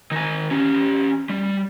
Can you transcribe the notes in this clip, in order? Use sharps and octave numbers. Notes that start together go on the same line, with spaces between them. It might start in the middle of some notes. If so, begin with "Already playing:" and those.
D#3 G#5
C#4 G4
G3